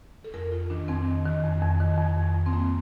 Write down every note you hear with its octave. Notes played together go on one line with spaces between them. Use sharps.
A4
F2 A#4
F2 F4
D#3 D4
F2 C4
D#3
D#3
F2
F2
D#3
F2
F2
F2
C4
F2 A#3